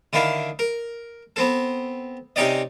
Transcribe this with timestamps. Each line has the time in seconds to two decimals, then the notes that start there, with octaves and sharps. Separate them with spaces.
0.13 D3 D#3 E4 F5 A5
0.59 A#4
1.36 B3 C4 A4
2.36 C3 C#4 D#4 G4 D5 D#5